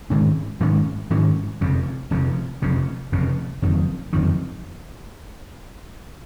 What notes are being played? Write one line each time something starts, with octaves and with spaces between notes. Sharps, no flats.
G#2 D#3 G#3 C#4
G#2 D#3 G#3 C#4
G#2 D#3 G#3 C#4
F1 F2 C#3
F1 F2 C#3
F1 F2 C#3
F1 F2 C#3
F#1 F2 D#3
F#1 F2 D#3